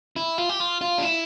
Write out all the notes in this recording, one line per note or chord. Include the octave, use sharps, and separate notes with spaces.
E4
F4
G4
F4
F4
D4
E4